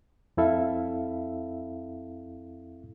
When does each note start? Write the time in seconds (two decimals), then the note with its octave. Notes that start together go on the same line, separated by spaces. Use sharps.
0.37 F2 C4 E4 A4 E5 F5